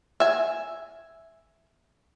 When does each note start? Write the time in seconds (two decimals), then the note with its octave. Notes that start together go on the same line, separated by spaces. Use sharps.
0.20 E5 G#5